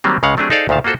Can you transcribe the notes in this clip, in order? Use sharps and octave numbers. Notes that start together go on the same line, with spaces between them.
D#3 F#3 G3 A#3 C4
C#2 C#3 G#3 F5 F#5
F#3 A3 C4 D4 G4 G#4
D#4 G#4 A4 C5 D5 F5
D2 A#2 D#3 F5 A5
A#3 F4 F#4 A4 C5